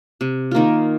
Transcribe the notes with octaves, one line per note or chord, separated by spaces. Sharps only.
C3
D#3 A#3 F4